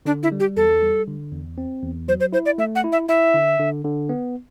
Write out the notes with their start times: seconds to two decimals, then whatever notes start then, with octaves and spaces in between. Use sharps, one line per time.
0.06 D3 D4
0.23 E4
0.32 G3
0.40 G4
0.57 E2 A4
0.82 G3
1.08 D3
1.32 E2
1.58 C4
1.83 E2
2.08 F#3 C5
2.20 C5
2.33 E4 C5
2.46 D5
2.58 A3 E5
2.75 F#5
2.84 E4
2.92 E5
3.09 E4 E5
3.34 D3
3.59 D3
3.85 D3
4.09 B3